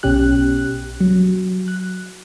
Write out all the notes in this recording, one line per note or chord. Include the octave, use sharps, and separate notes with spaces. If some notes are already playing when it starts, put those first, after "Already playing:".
B1 B2 C#4 G4 F#6
F#3
F#6